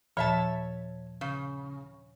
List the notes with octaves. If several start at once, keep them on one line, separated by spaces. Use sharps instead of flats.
D#2 A#2 F3 C#5 E5 A5
C#3